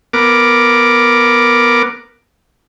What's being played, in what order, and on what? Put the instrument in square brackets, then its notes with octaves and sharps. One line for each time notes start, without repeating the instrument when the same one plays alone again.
[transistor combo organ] B3 A#4 D6